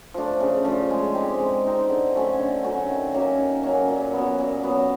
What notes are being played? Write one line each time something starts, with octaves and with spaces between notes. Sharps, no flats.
F3 A3 D4
C#3
F3 A3 D4
G#3
C4 D#4 G4
G#3
C4 D#4 G4
D3
F#3 A3 C#4
D3
F#3 A3 C#4
D#3
F#3 A#3 C#4
D#3
F#3 A#3 C#4
A#2
F#3 B3
A#2
F#3 B3